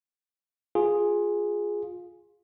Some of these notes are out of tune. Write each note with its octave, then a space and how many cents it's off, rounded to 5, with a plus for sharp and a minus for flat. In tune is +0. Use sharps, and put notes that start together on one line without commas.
F4 +15 G#4 +0